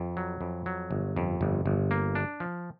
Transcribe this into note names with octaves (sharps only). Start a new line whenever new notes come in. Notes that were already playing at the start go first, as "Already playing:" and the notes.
Already playing: F2
F#3
F2
F#3
G1
F2
G1
G1
A#3
D4
F3